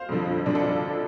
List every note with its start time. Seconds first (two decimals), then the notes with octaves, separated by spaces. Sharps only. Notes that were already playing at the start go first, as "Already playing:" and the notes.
Already playing: C5 F5
0.09 F2 D3 F3
0.46 F2 D3 F3 D4
0.55 F4 A4